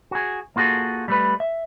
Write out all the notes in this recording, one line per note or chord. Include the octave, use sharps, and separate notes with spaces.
F#4 G#4
A#3 F4 F#4 G#4 A4
G3 A3 B4
E5